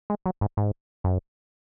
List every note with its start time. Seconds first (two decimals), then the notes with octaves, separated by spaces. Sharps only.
0.10 G#3
0.26 F#3
0.41 G#2
0.57 G#2
1.04 F#2